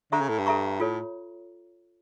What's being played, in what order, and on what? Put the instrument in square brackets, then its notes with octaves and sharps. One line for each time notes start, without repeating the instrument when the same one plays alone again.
[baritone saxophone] D3 [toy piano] A4 E5 A#5 C#6
[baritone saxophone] C#3
A2
G2
[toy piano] A4 E5 A#5 C#6
[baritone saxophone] A2 [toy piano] F4 A4 C#5